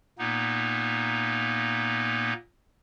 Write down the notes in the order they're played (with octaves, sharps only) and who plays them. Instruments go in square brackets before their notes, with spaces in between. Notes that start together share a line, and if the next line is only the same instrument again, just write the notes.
[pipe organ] A#2 A#3 B3 D#4